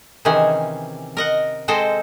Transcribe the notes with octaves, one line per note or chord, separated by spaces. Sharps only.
C3 D#3 E3 C#4 G#4
A#4 D#5 F#5
G#3 C4 A4 C5 D#5